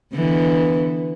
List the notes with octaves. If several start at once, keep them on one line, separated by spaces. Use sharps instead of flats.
D3 E3 B3